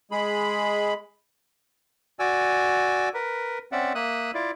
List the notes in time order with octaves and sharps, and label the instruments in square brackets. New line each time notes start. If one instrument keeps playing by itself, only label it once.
[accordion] G#3 G#4 B5
[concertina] F#4 D5 G#5 E6
A#4 B4
C4 C#4 D5 E5 F#5
A#3 E5 D#6 F#6
E4 F4 D5